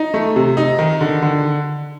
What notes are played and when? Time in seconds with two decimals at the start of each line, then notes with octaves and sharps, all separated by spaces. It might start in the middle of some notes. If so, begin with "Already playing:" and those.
Already playing: D#4
0.14 A3
0.36 C3
0.57 D#4
0.79 D#3
1.01 D3
1.22 D3